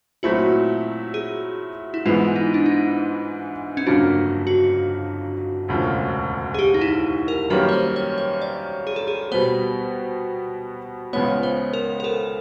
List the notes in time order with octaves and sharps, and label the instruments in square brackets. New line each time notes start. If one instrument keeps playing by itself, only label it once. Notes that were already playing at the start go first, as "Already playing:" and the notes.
[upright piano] A#2 F#3 A3 C4 E4 [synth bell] F#4
[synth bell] G#4
E4
[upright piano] G#2 E3 G#3 B3 [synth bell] F4
[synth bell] D#4
D4
D#4
C#4
[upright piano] G1 F2 C#3 F#3 A#3 [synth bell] D4
[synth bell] F#4
[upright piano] E1 D2 C#3 F3
[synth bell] G#4
G4
D#4
E4
A#4
[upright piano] F#2 D#3 G3 A#3 C#4 [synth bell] B4
[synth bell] C#5
C5
C#5
C#5
D5
G#4
A4
G#4
[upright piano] B2 G3 B3 [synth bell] C5
[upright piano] C#2 C#3 F3 G#3 B3 [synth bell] C#5
[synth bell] C5
A#4
A#4
A4